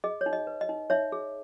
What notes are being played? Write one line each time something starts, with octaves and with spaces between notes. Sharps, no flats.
G#4 D#5
C#5
D#4
D#5
B4
D#5
D#4
D#4 C#5 E5
G#4